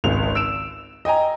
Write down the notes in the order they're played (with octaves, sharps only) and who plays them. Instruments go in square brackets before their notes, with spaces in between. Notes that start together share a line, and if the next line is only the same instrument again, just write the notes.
[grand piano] G#1 C#2 F7
E6 D7 E7
D#5 G5 G#5 A#5